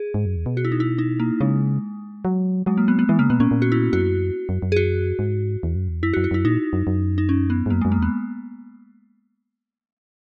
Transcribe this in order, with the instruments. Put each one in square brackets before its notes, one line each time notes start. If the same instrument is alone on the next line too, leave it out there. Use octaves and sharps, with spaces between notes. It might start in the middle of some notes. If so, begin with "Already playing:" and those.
Already playing: [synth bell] G#4
[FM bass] G#2
F#2
E2
B2
[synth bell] F#4
E4
D#4
E4
D#4
A#3
[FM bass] C#3 [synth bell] G#3
[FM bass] F#3
[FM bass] F#3 [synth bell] G#3
[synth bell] A#3
B3
B3
[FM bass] E3 [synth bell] G#3
[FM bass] C#3 [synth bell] A#3
[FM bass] B2 [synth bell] B3
[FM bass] A#2 [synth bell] C#4
[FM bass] A#2
[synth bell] F#4
E4
[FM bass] F#2 [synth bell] F#4
[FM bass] F#2
F#2
[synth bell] G#4
F#4
[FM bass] G#2
E2
F#2
E2
[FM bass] F#2 [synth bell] E4
[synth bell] F#4
[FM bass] F#2
[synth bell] F#4
[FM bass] F#2 [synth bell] E4
[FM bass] A#2 [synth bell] D#4
[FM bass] F#2
F#2
[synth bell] D#4
C#4
B3
[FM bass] G#2
[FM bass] F#2 [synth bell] A#3
[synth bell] G#3
[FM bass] F#2
[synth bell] A#3
[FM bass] E2 [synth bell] B3